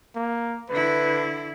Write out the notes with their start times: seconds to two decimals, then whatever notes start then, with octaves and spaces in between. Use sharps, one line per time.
0.15 A#3
0.70 D3 E4 B4